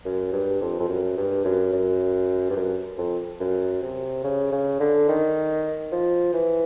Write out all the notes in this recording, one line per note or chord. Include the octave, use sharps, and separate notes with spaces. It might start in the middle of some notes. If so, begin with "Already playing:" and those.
F#2
G2
F2
F2
F#2
G2
F#2
F#2
G2
F#2
F2
F#2
C3
C#3
C#3
D3
D#3
F3
E3